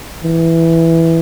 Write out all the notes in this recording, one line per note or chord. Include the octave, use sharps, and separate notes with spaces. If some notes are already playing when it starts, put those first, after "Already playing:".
E3